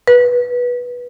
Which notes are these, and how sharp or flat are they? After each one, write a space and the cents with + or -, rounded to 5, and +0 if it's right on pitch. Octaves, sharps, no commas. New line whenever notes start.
B4 -15